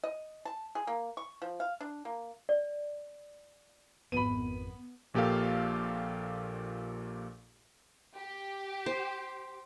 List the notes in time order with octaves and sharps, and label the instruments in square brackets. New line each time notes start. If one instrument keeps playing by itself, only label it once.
[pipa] D#5
A5
G#4
A#3
C#6
F3
F5
D4
A#3
[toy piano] D5
[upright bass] G#1 F2 [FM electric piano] B3 [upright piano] B5 D#7
[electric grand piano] A#1 A#2 G4 A4 F5
[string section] G4
[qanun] C5